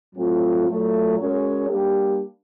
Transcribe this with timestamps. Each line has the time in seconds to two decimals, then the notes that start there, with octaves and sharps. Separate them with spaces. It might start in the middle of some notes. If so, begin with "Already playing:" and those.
0.15 A2 F#3 A3 C4 F4
0.67 A#2 F#3 A3
1.18 G#3 C#4 F#4 A#4 C#5
1.68 G3 A#3 D4 G4